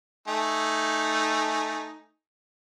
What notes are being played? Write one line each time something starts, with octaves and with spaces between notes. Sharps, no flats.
A3 D#4 G#5